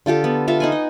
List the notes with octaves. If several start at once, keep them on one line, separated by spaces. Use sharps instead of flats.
D3 F4 G4 A4
B3
F4 A4 E5 F5
D#4 F#5 G#5
D#5